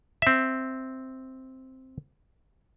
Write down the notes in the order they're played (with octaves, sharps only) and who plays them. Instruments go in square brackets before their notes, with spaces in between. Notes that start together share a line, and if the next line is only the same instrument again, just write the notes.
[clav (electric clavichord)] C4 E5